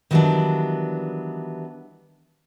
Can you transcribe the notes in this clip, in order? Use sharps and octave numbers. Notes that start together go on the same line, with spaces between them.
D#3 E3 F#3 G3 B3 D4